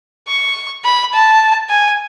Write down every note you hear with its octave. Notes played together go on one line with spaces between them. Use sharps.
C#6
B5
A5
G#5